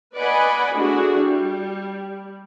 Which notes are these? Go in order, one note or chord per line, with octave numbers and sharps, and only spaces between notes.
B4 D5 D#5 F#5 G#5 B5
A3 D4 E4 F#4 G#4
G3